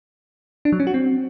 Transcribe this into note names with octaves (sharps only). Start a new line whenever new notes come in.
D4
F#3
C#4
F#4
C4